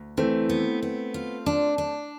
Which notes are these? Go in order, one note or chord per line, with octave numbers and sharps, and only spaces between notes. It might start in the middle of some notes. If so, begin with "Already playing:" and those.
Already playing: D2
E3 A3 C4
B3
B3
F4
D4
D4